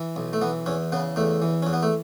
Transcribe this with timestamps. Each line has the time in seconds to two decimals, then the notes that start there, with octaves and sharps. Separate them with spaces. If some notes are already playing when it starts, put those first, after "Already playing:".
Already playing: E3
0.16 B1
0.33 A3
0.41 E3 B3
0.66 E2 C#4
0.92 C#3 B3
1.16 E2 A3
1.42 E3
1.62 E2 C#4
1.73 B3
1.83 A3